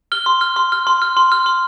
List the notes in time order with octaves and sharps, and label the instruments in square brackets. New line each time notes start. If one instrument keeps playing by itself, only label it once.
[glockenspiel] F6 G7
C6
F6
C6
F6
C6
F6
C6
F6
C6